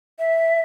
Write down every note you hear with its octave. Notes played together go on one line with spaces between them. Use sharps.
E5